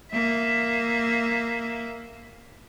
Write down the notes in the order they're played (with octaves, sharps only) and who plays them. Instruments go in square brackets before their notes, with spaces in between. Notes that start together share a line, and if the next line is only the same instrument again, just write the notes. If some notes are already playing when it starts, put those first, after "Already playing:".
[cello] A#3 E5